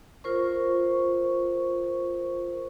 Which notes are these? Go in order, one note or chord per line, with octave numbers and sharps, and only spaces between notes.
F4 A#4 C5 C#6